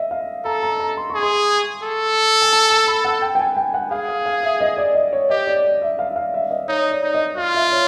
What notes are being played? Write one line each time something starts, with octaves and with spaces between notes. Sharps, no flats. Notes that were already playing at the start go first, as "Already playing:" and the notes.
Already playing: D#5 E5
F5
A4 A#5
A#5
A#5
C6
C#6
G#4
C6
A4
G#5
A5
A5
B5
F#5
G5
G5
G#5
G5
F#5
G#4 F5
F5
F5
E5
D#5
D5
D#5
C#5
G4 D#5
D5
D5
E5
F5
E5
F5
E5
D#5
D#4 C#5
D5
D#4
D#5
F4 F5
E5
C#5